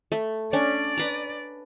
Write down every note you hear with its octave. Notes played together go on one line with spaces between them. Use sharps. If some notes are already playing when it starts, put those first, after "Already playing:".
A3
C#4 D4 D5
B4 A#5